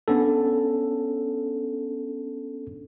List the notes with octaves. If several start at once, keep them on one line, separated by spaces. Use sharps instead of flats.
B3 C#4 D4 A4